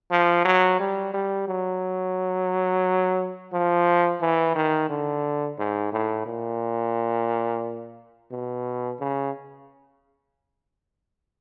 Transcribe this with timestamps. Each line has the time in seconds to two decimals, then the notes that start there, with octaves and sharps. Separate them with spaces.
0.11 F3
0.45 F#3
0.80 G3
1.13 G3
1.48 F#3
3.53 F3
4.21 E3
4.56 D#3
4.89 D3
5.58 G#2
5.92 A2
6.26 A#2
8.32 B2
9.00 C#3